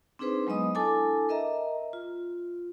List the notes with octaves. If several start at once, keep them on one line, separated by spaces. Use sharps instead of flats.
C4 D4 D#4 G#4 B4 C5
F#3 G#3 B3 D#5 D#6
D4 E4 A4 G#5 A5 D6
A#4 D#5 E5 A#5
F4